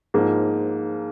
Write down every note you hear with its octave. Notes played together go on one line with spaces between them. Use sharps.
G#2 F3 A#3